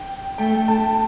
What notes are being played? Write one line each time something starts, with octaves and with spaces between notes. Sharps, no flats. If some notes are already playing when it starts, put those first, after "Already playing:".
Already playing: G5
A3 G5
A5